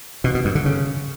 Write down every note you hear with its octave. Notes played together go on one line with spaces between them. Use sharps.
B2
B2
G2
D3
C#3